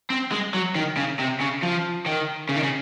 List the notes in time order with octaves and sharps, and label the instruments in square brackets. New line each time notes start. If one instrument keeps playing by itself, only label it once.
[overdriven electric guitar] C4
G#3
F#3
D#3
C#3
C3
C#3
F3
D#3
C#3
D#3
C#3